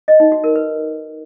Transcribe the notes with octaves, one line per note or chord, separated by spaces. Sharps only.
D#5
D#4
F#4
A#4
B4